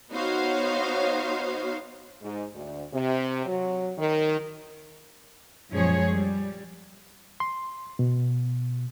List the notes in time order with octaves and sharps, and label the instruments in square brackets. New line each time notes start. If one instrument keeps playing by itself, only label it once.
[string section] B3 D#4 F#4 C5 C#5 F5
[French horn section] G#2
D2
C3
F#3
D#3
[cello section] F#2 A#2 F3 G#3 G#4 C#5
G3
[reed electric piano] C6
B2